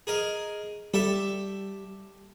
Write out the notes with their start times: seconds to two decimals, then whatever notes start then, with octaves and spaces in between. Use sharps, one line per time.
0.07 G#4 A#4 D#5
0.94 G3 G4 A4 E5